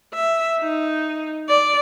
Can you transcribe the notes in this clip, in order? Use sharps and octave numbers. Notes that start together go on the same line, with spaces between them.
E5
D#4
D5